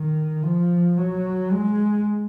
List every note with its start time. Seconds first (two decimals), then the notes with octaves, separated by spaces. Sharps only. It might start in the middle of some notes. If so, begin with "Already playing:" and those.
Already playing: D#3
0.43 F3
0.97 F#3
1.52 G#3